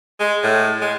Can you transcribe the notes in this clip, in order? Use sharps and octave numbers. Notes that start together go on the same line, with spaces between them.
G#3
A2
G#3